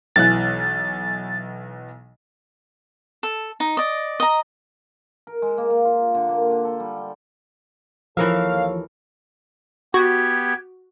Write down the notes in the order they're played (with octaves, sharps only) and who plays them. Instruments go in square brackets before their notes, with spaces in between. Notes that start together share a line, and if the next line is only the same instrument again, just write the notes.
[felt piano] B1 E3 F#6 [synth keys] A6
[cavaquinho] A4
D#4
D5 D#5
D#5 A#5
[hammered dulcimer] A#4
G#3
A#3
A#3
F4
D3
A#3
D3
A4
G3
G5
[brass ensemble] D#2 A4 C#5 [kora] E3 A#4 E5 [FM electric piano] F3 [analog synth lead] F5
[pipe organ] B3 G4 [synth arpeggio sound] F#4 [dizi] G#6